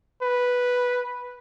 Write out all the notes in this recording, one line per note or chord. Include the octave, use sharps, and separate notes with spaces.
B4